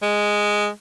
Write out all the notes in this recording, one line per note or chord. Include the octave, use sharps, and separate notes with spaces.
G#3